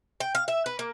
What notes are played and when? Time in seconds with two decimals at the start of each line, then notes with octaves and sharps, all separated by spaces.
0.20 G5
0.35 F5
0.48 E5
0.66 B4
0.79 A#3